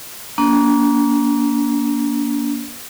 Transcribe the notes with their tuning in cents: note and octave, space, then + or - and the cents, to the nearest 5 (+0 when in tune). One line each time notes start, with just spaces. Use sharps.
A#3 +15 D4 -35